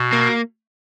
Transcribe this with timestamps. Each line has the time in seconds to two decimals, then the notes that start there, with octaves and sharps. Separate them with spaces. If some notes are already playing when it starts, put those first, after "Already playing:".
Already playing: B2
0.13 A#3